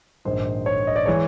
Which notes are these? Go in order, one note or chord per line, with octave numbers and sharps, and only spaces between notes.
A#1 G#2 D#3 C5
C#5
D#5
D5
E3 G#3 C#5